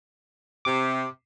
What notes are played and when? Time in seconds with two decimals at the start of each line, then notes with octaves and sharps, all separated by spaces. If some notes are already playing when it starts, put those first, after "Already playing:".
0.65 C3 D6